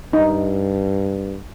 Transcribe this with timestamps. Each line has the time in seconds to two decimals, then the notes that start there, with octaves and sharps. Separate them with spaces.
0.13 G2 D#4